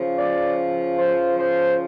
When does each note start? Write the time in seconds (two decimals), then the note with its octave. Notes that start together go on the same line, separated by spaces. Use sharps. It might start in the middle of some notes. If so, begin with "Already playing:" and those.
Already playing: C#3 F3
0.18 D5
0.98 C5
1.38 C5